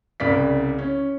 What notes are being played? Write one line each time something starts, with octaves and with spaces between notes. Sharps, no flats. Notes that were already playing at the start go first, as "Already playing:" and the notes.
C2 C#3 D5 B6
C#4